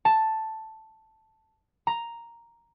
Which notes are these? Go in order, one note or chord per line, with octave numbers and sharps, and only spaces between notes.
A5
A#5